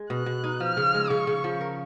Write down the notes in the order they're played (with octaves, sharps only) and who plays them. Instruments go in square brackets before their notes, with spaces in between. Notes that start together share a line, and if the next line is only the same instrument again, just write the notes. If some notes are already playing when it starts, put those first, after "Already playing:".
Already playing: [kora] G#3
[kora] B2 [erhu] F#6
[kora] B2
D#4
[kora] F3 [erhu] F6
[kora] C#3
G#3
[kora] C#3 [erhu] C#6
[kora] C#3
F3
A#4